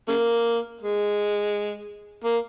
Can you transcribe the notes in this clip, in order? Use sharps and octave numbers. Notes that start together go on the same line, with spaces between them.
C#3 A#3
G#3
A#3